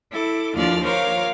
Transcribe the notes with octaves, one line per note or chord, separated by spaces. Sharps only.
E4 A4 D6
D#2 F3 D4 F4 D5 F6
A#4 C5 C#5 F5 D6